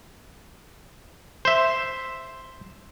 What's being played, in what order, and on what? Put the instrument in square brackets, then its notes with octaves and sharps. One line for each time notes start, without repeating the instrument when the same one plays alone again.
[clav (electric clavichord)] C5 E5